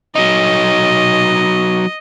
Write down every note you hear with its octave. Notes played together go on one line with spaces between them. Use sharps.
F#3 D#4 D#5